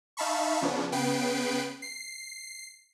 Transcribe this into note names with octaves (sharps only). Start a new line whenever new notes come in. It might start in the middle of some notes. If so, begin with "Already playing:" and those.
D#4 E5 F5 A5 B5 C#6
C#3 F3 B3 C#4 D4
C#3 B3 B4 G5 C7 D7
C7